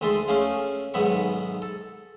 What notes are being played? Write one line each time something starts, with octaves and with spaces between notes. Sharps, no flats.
D2 D#3 G#3 E5 A5 C6
A3 C#4 G#4 F5
B1 G#2 D#3 B3 E5 C#6
A4